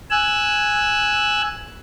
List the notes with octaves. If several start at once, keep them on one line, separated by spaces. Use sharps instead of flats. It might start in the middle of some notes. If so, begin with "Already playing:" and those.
G#5 E6 F#6